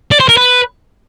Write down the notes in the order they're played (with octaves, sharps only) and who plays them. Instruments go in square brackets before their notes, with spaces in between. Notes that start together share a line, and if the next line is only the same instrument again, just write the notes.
[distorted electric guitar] D5
C5
A#4
B4